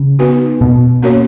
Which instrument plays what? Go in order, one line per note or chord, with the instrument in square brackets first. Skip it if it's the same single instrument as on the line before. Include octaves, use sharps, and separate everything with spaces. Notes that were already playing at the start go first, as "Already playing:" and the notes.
Already playing: [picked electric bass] C#3
[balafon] B3 D#4 F#4 B4
[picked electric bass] B2
[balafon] A#3 C#4 F#4 A#4 C#5